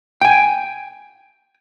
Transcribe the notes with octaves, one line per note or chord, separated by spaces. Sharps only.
G5 G#5